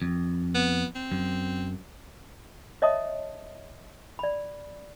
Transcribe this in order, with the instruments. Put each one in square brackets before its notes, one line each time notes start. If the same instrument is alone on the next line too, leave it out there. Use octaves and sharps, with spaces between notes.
[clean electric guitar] F2
[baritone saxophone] B3
C4
[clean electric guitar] F#2
[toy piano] C#5 D#5 E5 A5 D#6
D5 B5